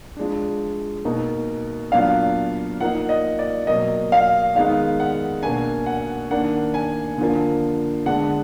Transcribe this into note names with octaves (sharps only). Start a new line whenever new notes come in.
F3 G#3 D4
B2 A#3 D#4
A#2 F#3 B3 D4 F5
F3 A#3 D#4 F#5
D#5
D5
B2 F#3 A#3 D#5
F5
D#3 G#3 B3 D#4 F5
F#5
B2 A#3 D4 G#5
F#5
D#3 A#3 D4 F#5
G#5
D3 F3 A#3
D3 G#3 B3 D4 F#5